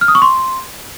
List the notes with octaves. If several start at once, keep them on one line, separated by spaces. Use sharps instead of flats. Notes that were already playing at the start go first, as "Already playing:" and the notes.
F6
D#6
C#6
C6